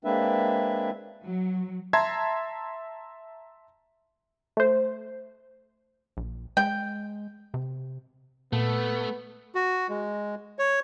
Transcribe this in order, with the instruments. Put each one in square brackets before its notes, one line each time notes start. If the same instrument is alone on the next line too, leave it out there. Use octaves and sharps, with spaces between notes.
[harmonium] G#3 A#3 C4 D4 B4 E5
[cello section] F#3
[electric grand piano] E5 A5 A#5 C6 G#6
[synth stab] A3 C5
[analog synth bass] A#1
[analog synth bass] G#3 [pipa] G5
[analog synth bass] C3
[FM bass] A#2 [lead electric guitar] A3 [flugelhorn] B3
[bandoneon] F#4
G#3
C#5